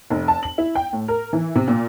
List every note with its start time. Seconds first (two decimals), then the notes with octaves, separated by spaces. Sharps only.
0.10 F1
0.28 A5
0.43 F#7
0.58 E4
0.75 G5
0.93 A2
1.08 A#4
1.33 E3
1.56 C3
1.68 A#2